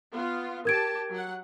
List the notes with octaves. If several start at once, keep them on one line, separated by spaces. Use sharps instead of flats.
B3 F4
G4 A#4 A5 G#6 D7
F#3 F#5